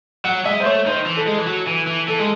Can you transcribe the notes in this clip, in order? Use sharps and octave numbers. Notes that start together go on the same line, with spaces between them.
F#3 F#5
G#3 E5
C5
A3 C#5
D#3 C5
E3
A4
G#3
E3
F#3
E3
E3
E3 A4
G#3